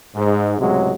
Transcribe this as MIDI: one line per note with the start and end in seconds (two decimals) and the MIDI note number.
0.15 0.58 44
0.59 0.91 37
0.59 0.91 45
0.59 0.91 48
0.59 0.91 54
0.59 0.91 56